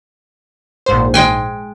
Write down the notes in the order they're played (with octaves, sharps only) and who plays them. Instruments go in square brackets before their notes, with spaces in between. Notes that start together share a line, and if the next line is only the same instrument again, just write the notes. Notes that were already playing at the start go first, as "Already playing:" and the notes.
[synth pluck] A#1 G#2 C5
[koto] G#3 G5 G#5